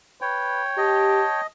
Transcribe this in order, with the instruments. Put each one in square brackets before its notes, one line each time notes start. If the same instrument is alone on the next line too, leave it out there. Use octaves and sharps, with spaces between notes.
[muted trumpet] B4 [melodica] C#5 G5
[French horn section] G4 [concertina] D#5 [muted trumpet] A5